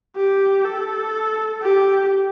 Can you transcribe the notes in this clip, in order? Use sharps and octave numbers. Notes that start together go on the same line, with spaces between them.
G4
A4
G4